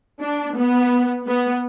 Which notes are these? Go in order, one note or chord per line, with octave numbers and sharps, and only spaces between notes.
D4
B3
B3